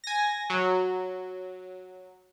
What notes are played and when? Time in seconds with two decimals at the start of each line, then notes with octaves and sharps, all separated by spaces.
0.04 G#5 A#6
0.50 F#3